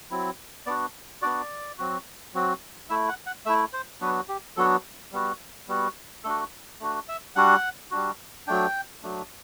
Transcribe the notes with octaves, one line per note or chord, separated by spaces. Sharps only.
F#3 C4 E4
B3 D4 F#4 D5
B3 D4 F#4 D5
F#3 C4 F#4
F#3 C4 F#4
A3 E4 E5
F#5
F#5
A3 E4 E5
C5
F#3 B3 D4 F#4 B4
G4
F#3 B3 D4 F#4 A4
G3 B3 F#4
G3 B3 F#4
A3 D4 F#4 A4
A3 D4 F#4
E5
G3 D4 F#4 F#5
G3 D4 F#4
F#3 A3 D4 G5
F#3 A3 D4